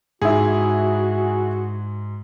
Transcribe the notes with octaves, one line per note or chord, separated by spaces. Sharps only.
G#2 E4 F#4 G#4